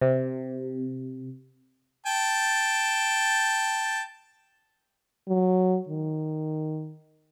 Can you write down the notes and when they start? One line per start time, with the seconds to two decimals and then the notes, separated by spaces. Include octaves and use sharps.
0.01 C3
2.06 G5 A5
5.28 F#3
5.89 D#3